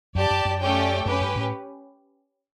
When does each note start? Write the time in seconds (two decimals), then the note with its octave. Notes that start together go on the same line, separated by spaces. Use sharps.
0.15 F#2 G4 D5 A5
0.31 F#2
0.45 F#2
0.60 A3 C#4 G4 D5 G5
1.06 F#2 C#4 G4 B4
1.21 G2
1.36 A2